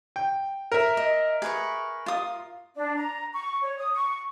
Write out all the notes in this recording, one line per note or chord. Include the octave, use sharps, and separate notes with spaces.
G5
A#4 E5
D#5
G#4 B4 C#6
F4 D#6
D4
A#5
C#6
C#5
D#6
C#6